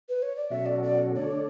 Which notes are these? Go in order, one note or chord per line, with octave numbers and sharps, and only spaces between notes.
B4
C#5
D5
B2 F#3 C#4 F#4 A4 E5
D5
D5
D3 A3 D4 A4 C#5 D5